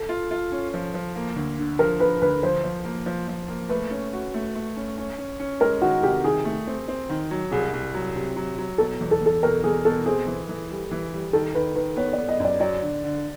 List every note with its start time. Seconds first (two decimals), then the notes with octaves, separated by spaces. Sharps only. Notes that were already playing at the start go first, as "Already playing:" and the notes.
Already playing: A4
0.09 F4
0.31 F4
0.52 C#4
0.74 F3
0.94 F3
1.16 A#3
1.36 D2
1.59 D3
1.79 F3 A#4
2.00 D3 B4
2.22 D2 B4
2.43 F3 C5
2.64 F3
2.85 A#3
3.06 F3
3.28 F3
3.48 A#3
3.69 A3 B4
3.91 C#4
4.13 F#4
4.34 A3
4.55 A3
4.76 C#4
4.98 C#4
5.18 C#4
5.40 C#4
5.60 G#3 A#4
5.82 D#3 F#4
6.03 C3 G4
6.24 D#3 G#4
6.45 A3
6.67 C4
6.88 C4
7.09 D#3
7.31 F#3
7.51 C2 G#4
7.73 C2
7.94 F#3
8.15 C3
8.36 F#3
8.58 F#3
8.78 B2 A4
9.01 E2
9.11 A4
9.21 E2 A4
9.43 B2 A#4
9.64 E2 G#4
9.85 B2 A4
10.06 C4 G#4
10.27 E3
10.49 E3
10.70 G3
10.91 E3
11.13 G3
11.33 D#3 A4
11.55 D#3 B4
11.75 D#3 B4
11.96 B3 C#5
12.13 D5
12.18 B3
12.29 D#5
12.40 F#2 D5
12.60 F#3 D5
12.82 D3
13.04 D3